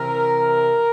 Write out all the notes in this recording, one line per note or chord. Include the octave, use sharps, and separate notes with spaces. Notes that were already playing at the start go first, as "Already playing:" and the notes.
Already playing: C3 E3 A#4